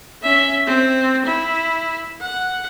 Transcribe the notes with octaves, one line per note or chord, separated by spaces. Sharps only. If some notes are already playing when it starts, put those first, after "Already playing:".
C#4 E5
C4
E4
F#5